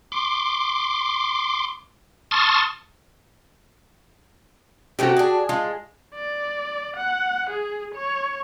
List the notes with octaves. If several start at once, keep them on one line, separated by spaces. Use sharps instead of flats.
C6 D6
A5 C6 C#6 D#6 F6 A6
C3 A3 C#4 F#4 G4
D4 G#4
G#3 F4
D5
F#5
G#4
C#5